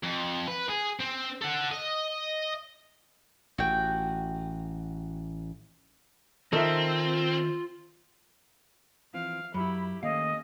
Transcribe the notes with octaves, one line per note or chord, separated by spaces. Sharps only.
F2
B4
G#4
C4
A4 F#5
D#5
A1 F#4 G5
D#3 C4 F4 A4 A#4 D#5 E5
E3 F3 C4 F5
F#2 F#3 E4 G4 B5
D#3 A3 A#3 C#4 D#5 F5